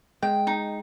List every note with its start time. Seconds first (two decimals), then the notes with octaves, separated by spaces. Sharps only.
0.22 G#3 G5
0.47 D#4